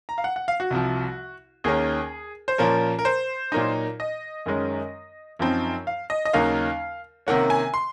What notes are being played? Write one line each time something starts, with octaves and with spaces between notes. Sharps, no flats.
A#5
F5
F#5
F#5
F5
F#4
C2 C3 F3
D#2 D#3 A#3 C#4 G#4
C5
A#2 F3 A#3 C#4 A#4
A#4
C5
A#2 F#3 A#3 D#4
D#5
F#2 D#3 G#3 C#4
F#2 F3 C4 D#4
F5
D#5
D#5
D#2 C#3 F#3 A#3 D#4 F5
C3 D#3 A#3 C#4 F#5
G#5
C6